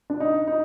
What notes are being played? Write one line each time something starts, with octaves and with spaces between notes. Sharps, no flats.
D4
D#4
D#4